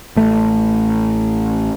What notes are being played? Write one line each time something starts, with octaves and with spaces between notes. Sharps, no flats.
A1 A3